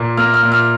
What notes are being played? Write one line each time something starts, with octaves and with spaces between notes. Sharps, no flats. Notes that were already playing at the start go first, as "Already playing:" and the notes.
Already playing: A#2 A#3
A#3 F6
F6
A#2
F6